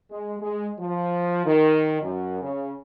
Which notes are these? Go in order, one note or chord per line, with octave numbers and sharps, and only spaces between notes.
G#3
G#3
F3
D#3
F#2
C#3